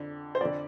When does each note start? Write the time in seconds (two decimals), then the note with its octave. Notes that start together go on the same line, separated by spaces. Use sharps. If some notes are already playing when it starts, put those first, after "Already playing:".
Already playing: F2 D3
0.35 C5
0.40 F2 D3 D5